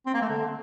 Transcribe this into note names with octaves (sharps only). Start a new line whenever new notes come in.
C4
A#3
A3
D3